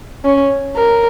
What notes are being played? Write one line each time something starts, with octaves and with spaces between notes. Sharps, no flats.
C#4
A#4